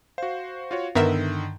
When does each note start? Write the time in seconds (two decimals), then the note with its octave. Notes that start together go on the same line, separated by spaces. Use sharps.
0.18 F#4 C5 F5
0.71 F4 F#4 C#5
0.95 G2 D3 D#3 B3 A#4 E5